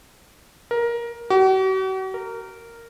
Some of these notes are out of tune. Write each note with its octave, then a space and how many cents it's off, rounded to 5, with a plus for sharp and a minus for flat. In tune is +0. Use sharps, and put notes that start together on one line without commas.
A#4 +15
F#4 +45
A#4 -10